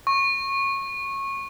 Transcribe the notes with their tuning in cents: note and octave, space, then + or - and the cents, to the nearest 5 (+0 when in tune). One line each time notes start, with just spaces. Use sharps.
C#6 -20